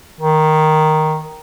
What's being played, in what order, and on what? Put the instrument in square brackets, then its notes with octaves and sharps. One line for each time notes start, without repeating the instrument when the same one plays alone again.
[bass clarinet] D#3